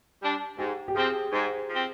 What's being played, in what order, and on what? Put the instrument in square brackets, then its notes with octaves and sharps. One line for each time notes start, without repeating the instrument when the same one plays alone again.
[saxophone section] G3 D4
[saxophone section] G#2 [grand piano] G4
[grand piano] G4
[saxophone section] F3 C4 [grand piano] G#4
[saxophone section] G#2 [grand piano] C5
[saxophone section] F3 C4